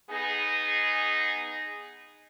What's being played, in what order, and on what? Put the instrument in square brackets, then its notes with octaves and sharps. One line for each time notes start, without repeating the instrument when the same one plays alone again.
[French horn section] B3 D#4 G#4